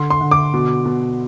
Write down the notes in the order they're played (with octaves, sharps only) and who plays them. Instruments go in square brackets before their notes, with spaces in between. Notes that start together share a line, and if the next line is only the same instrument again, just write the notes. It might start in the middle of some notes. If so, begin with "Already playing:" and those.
Already playing: [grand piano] D3 C6
C6
D3
D6
B2
B2